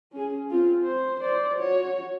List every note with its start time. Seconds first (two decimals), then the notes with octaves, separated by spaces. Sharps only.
0.12 C#4 G#4
0.50 C4 F4
0.83 C5
1.20 C5 D5
1.59 F#4 C#5